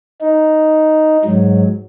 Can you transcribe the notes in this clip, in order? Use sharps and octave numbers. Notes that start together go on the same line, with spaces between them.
D#4
G#2 F#3